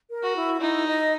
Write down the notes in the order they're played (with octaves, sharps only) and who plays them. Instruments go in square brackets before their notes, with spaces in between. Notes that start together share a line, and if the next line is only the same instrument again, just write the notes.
[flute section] A#4
[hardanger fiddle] F#4
[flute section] E4
[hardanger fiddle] D#4 [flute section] E4
[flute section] D#5